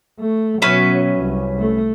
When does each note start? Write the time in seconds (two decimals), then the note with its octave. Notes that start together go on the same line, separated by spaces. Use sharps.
0.19 A3
0.62 B2 F#3 C#4 B4 E5
1.20 C2
1.59 A3